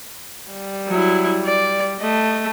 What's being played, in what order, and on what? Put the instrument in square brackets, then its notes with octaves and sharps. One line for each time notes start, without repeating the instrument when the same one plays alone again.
[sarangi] G3
[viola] F#3 E4
D5
[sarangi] A3 [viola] D#5